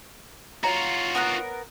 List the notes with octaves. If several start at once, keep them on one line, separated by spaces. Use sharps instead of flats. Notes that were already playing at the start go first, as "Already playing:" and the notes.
F4 F#4 C#5 A#5
B3 A#4 F#6